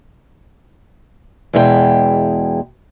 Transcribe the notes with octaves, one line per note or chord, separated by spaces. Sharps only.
E2 B2 G#3 E4 A4 G5